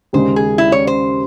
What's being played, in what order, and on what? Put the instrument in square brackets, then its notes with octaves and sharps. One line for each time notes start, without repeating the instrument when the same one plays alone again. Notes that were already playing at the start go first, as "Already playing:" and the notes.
[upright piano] D#2 C#3 G#3 [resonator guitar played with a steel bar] C5
[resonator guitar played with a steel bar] G#4
E4
C#5
C5